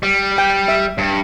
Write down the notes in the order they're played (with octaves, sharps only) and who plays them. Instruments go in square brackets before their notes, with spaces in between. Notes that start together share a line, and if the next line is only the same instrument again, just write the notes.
[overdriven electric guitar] G3
[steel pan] G5
E5
[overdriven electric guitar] G2